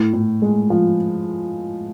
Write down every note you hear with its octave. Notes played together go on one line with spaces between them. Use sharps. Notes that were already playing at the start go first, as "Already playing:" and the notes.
Already playing: A2
A2
G#3
F3